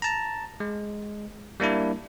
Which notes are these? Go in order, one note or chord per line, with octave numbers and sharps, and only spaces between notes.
A5 A#5
G#3
G3 A#3 D4 E4